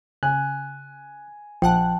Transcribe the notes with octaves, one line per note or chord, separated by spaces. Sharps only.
C#3 G#5 F#6
A#1 F3 F#5 G5 A5 F#6